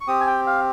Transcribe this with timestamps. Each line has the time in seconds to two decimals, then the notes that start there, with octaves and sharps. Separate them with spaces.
0.01 C#6
0.07 C4 G4 D#6
0.21 G#5
0.27 G5
0.47 F5